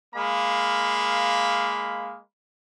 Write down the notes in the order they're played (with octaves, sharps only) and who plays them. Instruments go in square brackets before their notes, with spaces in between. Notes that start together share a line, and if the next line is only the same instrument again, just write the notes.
[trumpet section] G#3 A#3 F5 B5